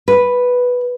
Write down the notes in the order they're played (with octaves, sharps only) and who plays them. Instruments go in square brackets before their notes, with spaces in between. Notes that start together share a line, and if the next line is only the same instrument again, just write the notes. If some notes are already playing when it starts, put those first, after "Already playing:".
[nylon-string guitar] B4